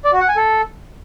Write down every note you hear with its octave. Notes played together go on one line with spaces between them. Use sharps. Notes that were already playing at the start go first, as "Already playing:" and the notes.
D5
F#4
F#5
G#5
A4